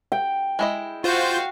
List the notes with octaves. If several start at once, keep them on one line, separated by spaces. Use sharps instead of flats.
G5
G#3 E4 D#5
F4 F#4 C5 F5 G6